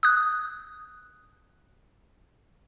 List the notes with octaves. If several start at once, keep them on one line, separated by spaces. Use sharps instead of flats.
D#6 F#6